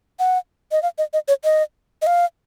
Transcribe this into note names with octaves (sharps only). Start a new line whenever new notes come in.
F#5
D#5
F5
D#5
D#5
C#5
D#5
D#5
F5